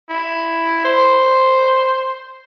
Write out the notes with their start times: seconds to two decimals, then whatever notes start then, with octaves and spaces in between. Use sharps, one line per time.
0.09 E4
0.84 C5